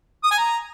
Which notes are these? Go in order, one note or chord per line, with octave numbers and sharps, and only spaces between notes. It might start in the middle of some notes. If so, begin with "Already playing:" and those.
D#6
G#5
A#5